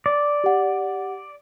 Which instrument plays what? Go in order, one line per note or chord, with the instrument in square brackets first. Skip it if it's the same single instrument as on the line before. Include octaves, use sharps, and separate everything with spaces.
[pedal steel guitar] D5
[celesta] G4 F#5